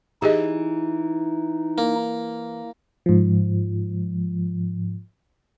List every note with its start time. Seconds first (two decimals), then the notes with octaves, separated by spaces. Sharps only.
0.22 E3 D#4 G4 G#4 D#5
1.78 A#3
3.06 G#2 F3